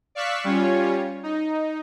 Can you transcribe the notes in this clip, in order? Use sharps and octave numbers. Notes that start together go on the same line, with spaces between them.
D5 F5 C#6 E6 F#6 B6
G3 C#4 F4 C#5
D#4